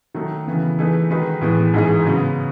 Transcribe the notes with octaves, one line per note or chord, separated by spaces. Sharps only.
D#3 F#3 A3
C#3 E3 B3
E3 A3 D#4 G#4 B4
D#3 G#3 D#4 F#4 B4
A2 E3 G#3 B3
G#2 E3 G#3 D#4 G#4
C#3 F#3 B3